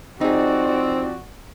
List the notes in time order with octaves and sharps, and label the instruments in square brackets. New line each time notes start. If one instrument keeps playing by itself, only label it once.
[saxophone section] F3 C4 [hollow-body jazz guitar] D#4 G#4 [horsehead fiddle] F#4 D5